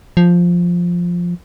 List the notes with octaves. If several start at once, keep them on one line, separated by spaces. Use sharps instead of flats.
F3